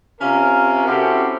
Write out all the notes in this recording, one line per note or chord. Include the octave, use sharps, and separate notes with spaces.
C3 C#4 F4 A#4
C4 C#4 E4 F#4 G4 A4